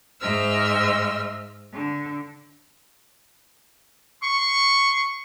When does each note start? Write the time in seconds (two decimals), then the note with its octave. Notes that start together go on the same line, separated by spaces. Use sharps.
0.21 G#2 C5 D#5 E5 E6 F6
1.73 D3
4.23 C6 C#6